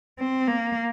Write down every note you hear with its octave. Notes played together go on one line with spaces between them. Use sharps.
C4
A#3